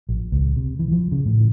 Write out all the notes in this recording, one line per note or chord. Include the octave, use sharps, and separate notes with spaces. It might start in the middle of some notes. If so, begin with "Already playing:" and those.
A#1
C#2
C3
E3
F3
C#3
A2